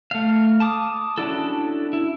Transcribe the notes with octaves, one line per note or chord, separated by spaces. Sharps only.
A3 F5
A5 D6 D#6
C#4 D4 E4 F#4 A4
E4